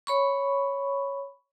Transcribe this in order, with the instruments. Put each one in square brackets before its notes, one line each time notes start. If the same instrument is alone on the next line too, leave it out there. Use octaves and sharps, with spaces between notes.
[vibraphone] C#5 B5 C#6